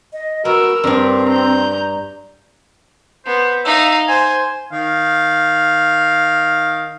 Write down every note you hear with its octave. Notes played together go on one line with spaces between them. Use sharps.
D#5
B3 F#4 A#4 E6
G2 C4 D4 A#4
A#5 G6
B3 C5
D#4 E5 F5
C5 G#5
D#3 F5